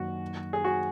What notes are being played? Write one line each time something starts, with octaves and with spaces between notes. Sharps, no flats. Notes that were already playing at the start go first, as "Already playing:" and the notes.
Already playing: F#2 D#3 F#3 A#3 D#4 F#4
G#4
F#4